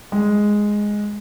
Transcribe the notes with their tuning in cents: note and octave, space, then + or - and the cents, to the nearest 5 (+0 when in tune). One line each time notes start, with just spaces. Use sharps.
G#3 +0